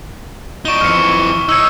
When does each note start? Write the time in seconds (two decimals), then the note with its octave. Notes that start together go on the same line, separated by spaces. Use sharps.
0.65 D#4 D5 C#6 E7 G7
0.81 F2 E3 F6 C#7
1.49 D#4 C#5 E6 G#6